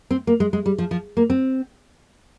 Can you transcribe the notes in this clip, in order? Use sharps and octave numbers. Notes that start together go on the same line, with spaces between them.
C4
A#3
G#3
G#3
G3
F3
F3
A#3
C4